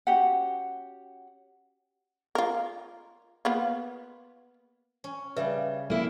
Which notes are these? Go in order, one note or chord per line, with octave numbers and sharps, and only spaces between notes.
C#4 F#4 G4 F#5
F4 A#4
A#3 B3 F4
C#4
C#3 G3 B4 E5
A#3 E4